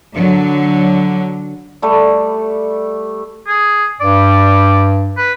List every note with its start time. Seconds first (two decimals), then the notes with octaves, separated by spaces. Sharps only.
0.14 D3 F#3
1.82 G3 A3
3.47 G#4
4.01 G2 D5
5.17 B4